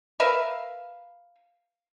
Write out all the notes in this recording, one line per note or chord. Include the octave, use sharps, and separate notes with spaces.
A#4 B4 E5 F5